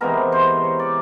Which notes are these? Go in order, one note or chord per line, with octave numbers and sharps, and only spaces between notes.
C3 E3 G#3 B3 A#4
C5
C#5
D5